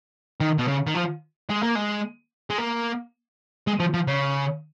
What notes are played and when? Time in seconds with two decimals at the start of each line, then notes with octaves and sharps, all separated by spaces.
0.40 D#3
0.58 B2
0.68 C#3
0.87 D#3
0.94 F3
1.50 G#3
1.63 A#3
1.76 G#3
2.50 G#3
2.58 A#3
3.67 G#3
3.80 F3
3.94 F3
4.07 C#3